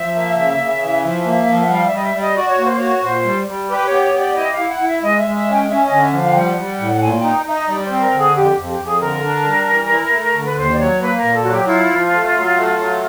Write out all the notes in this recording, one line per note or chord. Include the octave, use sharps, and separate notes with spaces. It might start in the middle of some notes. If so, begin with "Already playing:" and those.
Already playing: F3 E5
A#3
C#3
C#3
E3
F3 E5
A#3
F3
F#5
G3 F5
E5
G3 D#5
E5
G3
D#5
F#4 D5
C#5
A#3 C5
F#4 C#5
A#2 C5
G3
G3
G4 B4
C#5
B3
C#5
G4 D5
E4 D#5
F5
E4
F#5
E4
E5
G#3 D#5
E5
G#3
E5
C#4
G5
C#4 E5
D#5
D3
E5
F3
F5
G5
G3 F#5
G3
A2
A#2 G#5
D#4 G5
D#4 E5
D#5
G3 D5
C5
C4
A#4
D3
G#4
F2 G4
F2
G4
F2
G#4
D3 A#4
D4
G3
E3
E4
A3
D3
B4
D#2 C5
D5
F#3 C#5
A#3 B4
A#2 A#4
A4
F#3 F#4
G4
E4 F4
F3
A3
F#3
A3
F#3